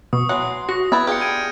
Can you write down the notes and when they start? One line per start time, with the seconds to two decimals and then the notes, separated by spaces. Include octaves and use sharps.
0.13 B2 C#6 D#6
0.29 E3 F#3 F#5 C6
0.69 F#4 A#6
0.92 B3 E4 B4 E5 G#6 A6
1.07 D4 F4 G4 G#4 F6 G6 C#7
1.21 G#6 D7 D#7